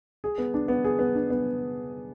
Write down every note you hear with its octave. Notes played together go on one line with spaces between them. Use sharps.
G#4
B3
D4
B3
G#4
B3
D4
B3